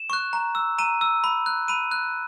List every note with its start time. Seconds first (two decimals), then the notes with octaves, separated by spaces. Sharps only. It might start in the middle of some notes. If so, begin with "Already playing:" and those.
Already playing: E7
0.10 C#6 F#6
0.33 A#5
0.55 E6
0.79 A#5 D#7
1.01 E6
1.24 B5
1.46 F#6
1.68 B5 D#7
1.92 F#6